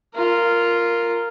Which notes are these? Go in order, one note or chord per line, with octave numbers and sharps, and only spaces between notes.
F4 A#4